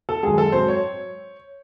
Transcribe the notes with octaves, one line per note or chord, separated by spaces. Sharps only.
A4
F#2 D#3 G#3 G#4
A4
G#2 F#3 C4 C5
C#5